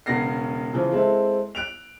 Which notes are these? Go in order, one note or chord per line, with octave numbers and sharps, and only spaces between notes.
E1 C#3 B3 A#6 C7
C#3 E3 F3
G#3 C4 E4 A4
F#6 D7 F7